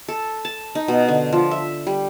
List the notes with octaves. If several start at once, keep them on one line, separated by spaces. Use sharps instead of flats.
A4
A5
D#4
B2
D3
F3
E5
G3